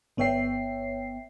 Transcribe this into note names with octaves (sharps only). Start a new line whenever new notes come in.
G1 B3 C#5 E5 G5 C7